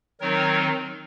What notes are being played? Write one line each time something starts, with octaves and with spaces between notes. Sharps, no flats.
D#3 F#3 C4 D#4 A#4 C#5